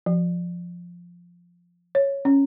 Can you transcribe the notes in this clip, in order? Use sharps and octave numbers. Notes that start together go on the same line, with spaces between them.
F3
C#5
C#4